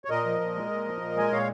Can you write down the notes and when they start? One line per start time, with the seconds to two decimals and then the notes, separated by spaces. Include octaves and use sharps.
0.05 C#5
0.09 A#2 A#4 D#5
0.25 F3
0.40 A#2
0.56 G#3
0.71 A#2
0.86 F3
1.01 A#2
1.17 G#3 G#5
1.32 A#2 C#5 F5